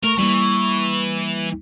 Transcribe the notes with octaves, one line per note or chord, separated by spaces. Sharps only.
A3 A#4 C#6
E3 G3 A#3